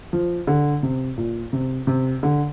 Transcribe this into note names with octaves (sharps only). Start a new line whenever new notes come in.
F3
D3
C3
A#2
C3
C3
D3